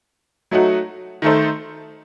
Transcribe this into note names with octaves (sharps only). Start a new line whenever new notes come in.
F#3 A3 D#4 F#4
D#3 A3 D#4 A4 C5